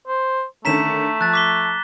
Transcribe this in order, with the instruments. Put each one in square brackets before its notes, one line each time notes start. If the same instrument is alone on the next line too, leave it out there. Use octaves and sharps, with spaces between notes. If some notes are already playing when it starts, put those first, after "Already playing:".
[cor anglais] C5
[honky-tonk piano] D3 D#3 C#4 [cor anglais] A3 [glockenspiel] A#5 B6 E7
[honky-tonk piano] F3 [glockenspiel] F#6 A6
[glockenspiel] D6 B6 G7